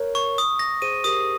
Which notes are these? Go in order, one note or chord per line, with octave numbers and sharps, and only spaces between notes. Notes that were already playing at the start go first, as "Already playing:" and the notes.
Already playing: A#4 C#5
C#6
D#6
A#6
G#4 C5 D#7
G4 A#4 D#6